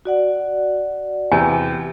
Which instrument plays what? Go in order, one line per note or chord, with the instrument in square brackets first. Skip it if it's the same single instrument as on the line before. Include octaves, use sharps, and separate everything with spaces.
[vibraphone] F#4 D5 F#5
[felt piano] E2 C3 [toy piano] G#5